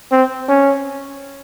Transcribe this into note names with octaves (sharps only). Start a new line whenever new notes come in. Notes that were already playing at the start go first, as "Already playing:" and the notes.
C4
C#4